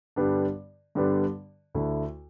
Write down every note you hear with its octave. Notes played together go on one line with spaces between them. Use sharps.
G2 D3 G3 B3 D4
G2 D3 G3 B3 D4
D2 D3 A3 E4